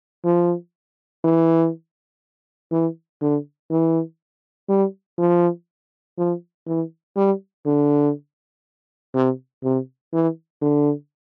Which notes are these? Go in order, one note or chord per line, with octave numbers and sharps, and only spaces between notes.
F3
E3
E3
D3
E3
G3
F3
F3
E3
G3
D3
C3
C3
E3
D3